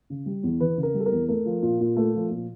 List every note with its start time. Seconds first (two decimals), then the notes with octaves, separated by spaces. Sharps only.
0.10 C#3
0.26 G3
0.43 E2
0.60 E3 B4
0.77 C#3
0.83 A#4
0.94 G3
1.00 A4
1.06 A#4
1.12 E2
1.28 A3 A#4
1.45 F3
1.63 A#2
1.81 A#2
1.97 A3
2.14 F3
2.31 A#2